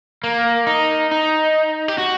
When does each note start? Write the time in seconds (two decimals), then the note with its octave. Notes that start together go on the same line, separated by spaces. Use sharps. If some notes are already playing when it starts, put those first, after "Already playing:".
0.23 A#3
0.67 D#4
1.11 D#4
1.88 G4
1.98 F#4